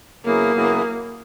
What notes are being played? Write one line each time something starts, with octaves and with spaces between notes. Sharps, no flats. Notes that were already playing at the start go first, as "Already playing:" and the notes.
C#3 F#3 A#3 B3 E4 G#4
C#3 F#3 B3 E4 G#4